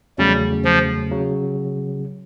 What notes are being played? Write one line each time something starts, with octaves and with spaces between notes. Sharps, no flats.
E2 C#3 F#3 G3 A3 C#4
F3
C#3 F#3